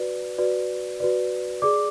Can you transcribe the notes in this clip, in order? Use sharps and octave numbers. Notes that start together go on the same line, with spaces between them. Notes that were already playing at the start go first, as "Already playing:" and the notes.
Already playing: F#4 B4 D5
F#4 B4 D5
F#4 B4 D5
G#4 D5 D6